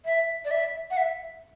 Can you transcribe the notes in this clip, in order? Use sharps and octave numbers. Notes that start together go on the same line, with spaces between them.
E5
D5
E5
F#5
E5